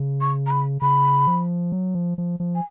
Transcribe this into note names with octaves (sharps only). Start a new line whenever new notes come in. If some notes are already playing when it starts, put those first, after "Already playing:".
Already playing: C#3
C#6
A#5
B5
C#3 B5
F3
F#3
F3
F3
F3
G#5